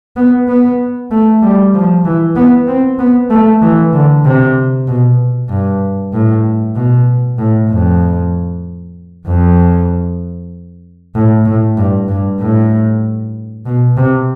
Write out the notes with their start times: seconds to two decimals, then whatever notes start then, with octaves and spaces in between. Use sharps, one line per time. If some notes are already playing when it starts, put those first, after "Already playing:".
0.16 B3
0.48 B3
1.11 A3
1.42 G3
1.74 F3
2.05 E3
2.36 B3
2.68 C4
2.99 B3
3.30 A3
3.62 E3
3.93 D3
4.25 C3
4.88 B2
5.49 G2
6.13 A2
6.76 B2
7.38 A2
7.70 F2
9.26 F2
11.15 A2
11.46 A2
11.77 G2
12.08 G2
12.40 A2
13.66 B2
13.97 C3